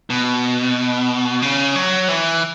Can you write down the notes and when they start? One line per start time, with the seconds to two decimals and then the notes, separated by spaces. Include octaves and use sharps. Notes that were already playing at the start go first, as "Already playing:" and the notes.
0.10 B2
1.42 C#3
1.76 F#3
2.08 E3